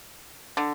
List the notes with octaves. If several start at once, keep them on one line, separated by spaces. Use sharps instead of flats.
D3